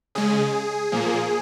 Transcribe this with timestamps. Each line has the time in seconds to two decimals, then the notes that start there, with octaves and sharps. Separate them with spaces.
0.15 C#3 G#3 G#4
0.92 A#2 F3 A#3